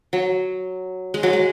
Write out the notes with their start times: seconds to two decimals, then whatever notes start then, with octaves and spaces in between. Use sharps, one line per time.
0.13 F#3
1.14 G#3
1.23 F#3
1.33 G#3